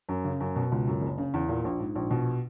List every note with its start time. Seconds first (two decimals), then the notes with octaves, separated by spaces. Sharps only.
0.09 F#2
0.24 C#3
0.40 F#2
0.56 B2
0.72 C#2
0.87 F#2
1.02 F#1
1.18 C#3
1.34 E2
1.49 A#2
1.64 A#1
1.80 G#2
1.95 A#1
2.11 B2